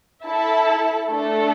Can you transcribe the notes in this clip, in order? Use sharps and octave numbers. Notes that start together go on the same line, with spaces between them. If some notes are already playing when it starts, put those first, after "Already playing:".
E4 A4 E5 A5
A3 D4 A4